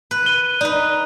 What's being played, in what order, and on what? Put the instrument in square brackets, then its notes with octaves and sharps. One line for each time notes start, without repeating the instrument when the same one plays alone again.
[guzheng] B4
[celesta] D#7 G7
[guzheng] D#4 B4 [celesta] D5